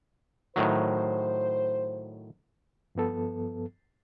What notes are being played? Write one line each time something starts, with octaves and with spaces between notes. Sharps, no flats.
A2 D#3 F#3 C5
G2 F3 B3 A4